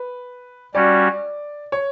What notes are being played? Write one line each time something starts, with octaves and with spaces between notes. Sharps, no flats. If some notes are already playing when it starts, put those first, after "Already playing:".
Already playing: B4
G3 C#4 F#4 D5
C#5